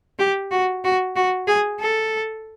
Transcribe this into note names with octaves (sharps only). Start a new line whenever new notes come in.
G4
F#4
F#4
F#4
G#4
A4